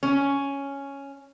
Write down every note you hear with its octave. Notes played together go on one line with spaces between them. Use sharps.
C#4